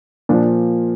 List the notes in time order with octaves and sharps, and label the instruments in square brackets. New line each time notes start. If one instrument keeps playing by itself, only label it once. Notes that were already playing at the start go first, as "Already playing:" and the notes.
[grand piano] A#2 F3 D4